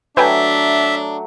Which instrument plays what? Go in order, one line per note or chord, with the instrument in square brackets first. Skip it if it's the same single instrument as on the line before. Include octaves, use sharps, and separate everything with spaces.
[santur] F#3 A3 [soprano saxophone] D4 [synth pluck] B4 G5 G#5 [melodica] E5